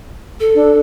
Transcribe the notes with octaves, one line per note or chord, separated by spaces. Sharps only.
A4
D4